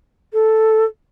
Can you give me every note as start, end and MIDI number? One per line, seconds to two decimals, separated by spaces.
0.33 0.85 69